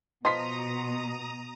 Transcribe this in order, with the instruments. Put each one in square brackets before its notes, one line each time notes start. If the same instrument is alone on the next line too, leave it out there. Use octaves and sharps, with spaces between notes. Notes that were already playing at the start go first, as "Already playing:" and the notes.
[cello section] B2 [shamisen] F3 B3 D#5 [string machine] A#5 D#6 [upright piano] C6 B6